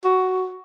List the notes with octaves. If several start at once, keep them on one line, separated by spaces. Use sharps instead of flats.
F#4